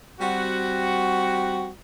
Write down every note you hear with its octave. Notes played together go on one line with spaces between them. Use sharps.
G3 C4 F#4